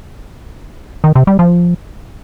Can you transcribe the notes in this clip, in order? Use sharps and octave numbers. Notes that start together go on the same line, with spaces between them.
D#3
C3
G3
F3